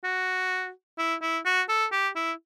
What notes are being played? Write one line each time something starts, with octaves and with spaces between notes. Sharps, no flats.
F#4
E4
E4
F#4
A4
G4
E4